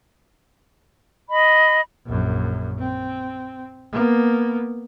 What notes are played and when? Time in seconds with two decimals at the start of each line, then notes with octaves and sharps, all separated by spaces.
1.30 D#5 B5
2.06 A#1 F#2
2.78 C4
3.92 A#3 B3